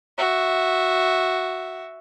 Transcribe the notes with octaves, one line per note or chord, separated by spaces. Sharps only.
F#4 E5